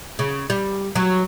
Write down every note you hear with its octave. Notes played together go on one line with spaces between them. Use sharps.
C#3
G3
F#3